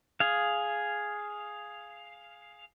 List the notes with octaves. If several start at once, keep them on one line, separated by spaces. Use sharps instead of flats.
G#4 F5